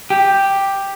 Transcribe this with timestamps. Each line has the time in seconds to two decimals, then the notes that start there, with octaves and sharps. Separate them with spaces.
0.10 G4